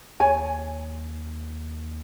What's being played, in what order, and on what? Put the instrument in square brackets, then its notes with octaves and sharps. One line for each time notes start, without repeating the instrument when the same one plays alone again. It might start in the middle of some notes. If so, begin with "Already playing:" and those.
[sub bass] D#2 [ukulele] C#5 G#5 A5